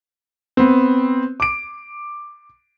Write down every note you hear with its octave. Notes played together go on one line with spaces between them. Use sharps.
B3 C4
D6 D7